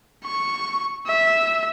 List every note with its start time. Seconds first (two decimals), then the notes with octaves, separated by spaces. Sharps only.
0.25 C#6
1.07 E5